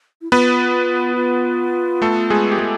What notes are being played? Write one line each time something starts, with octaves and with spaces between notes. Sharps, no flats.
E4
B3 F4 B4
F4
A3 A4
G#3 G#4
G4
G#3 G#4